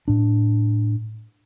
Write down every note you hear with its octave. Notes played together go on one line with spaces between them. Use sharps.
A2 D4